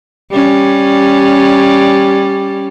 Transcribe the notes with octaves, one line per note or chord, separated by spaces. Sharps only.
G3 C#4